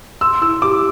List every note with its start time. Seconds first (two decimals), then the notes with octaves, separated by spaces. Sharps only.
0.21 C6 E6
0.41 E4 E6
0.62 G4 D6